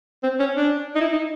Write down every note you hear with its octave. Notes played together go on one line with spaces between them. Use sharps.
C4
C#4
D4
D#4
E4
D#4